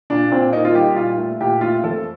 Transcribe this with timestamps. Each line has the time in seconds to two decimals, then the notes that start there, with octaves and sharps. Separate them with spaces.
0.10 A#2 D4
0.31 A#2 C4
0.53 A#3 D#4
0.65 F4
0.75 G3 G4
0.96 A#2 F4
1.18 A3
1.41 A#2 G4
1.61 A3 F4
1.84 F2 A4